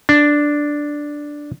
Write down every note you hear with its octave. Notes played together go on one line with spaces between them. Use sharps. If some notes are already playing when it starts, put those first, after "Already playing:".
D4